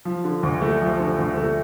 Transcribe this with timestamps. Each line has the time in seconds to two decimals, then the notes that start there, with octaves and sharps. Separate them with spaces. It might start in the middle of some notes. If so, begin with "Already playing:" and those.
0.05 F3
0.24 D3
0.43 D2
0.62 A3
0.81 F3
1.00 D3
1.18 D2
1.37 A3